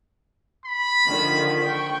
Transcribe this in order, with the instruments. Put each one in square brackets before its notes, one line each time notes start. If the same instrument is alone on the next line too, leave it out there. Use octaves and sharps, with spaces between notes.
[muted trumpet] B5
[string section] D3 D#3 F3
G5 C#6